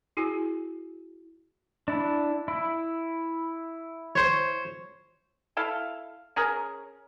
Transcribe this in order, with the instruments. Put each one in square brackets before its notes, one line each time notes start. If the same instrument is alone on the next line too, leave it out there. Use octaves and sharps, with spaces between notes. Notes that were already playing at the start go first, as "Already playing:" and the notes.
[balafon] E4 F#4 G#4 G#5
[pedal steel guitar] D4 E4
E4
[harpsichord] C5 C#5
[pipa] E4 A4 F5
C#4 G#4 A#4